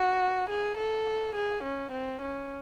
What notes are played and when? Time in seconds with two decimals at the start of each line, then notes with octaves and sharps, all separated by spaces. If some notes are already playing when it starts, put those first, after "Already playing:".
Already playing: F#4
0.50 G#4
0.77 A4
1.35 G#4
1.63 C#4
1.92 C4
2.22 C#4